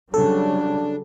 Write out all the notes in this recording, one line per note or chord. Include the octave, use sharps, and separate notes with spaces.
C#3 F#3 G3 D4 A4